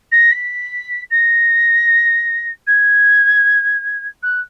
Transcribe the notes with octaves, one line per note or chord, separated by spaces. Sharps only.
A#6
B6
A#6
G#6
F#6